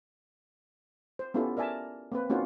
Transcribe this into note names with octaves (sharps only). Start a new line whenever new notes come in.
C5
B3 C#4 E4 F4 G4 A4
A#4 D5 E5 G#5 A5
A#3 C4 B4
A#3 C4 C#4 D#4 F4 F#4